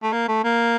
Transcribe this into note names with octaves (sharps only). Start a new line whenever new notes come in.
A3
A#3
A3
A#3